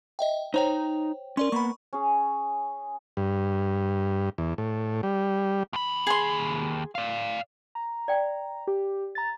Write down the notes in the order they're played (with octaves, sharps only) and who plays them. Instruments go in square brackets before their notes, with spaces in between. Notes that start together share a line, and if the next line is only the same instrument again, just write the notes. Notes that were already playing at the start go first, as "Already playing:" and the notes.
[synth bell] D#5 E5 G5
[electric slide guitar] D#4 A#5 [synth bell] C5 C#5 G5
[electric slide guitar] C#4 [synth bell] A#4 D5 C6
[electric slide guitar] A#3 B3 [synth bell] B5 C#6
[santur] C#4 G#4
[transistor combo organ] G2
E2
A2
G3
[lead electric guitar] D#2 B5
[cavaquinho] G#4 C6
[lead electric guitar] D5 F5
[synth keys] A#5
[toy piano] D5 G5
[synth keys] G4
A#5 A6